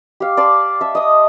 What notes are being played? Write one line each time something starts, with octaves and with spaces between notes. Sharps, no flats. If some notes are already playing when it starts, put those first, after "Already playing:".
G4 F5
D5 A5 C6
E5 A5
D#5 D#6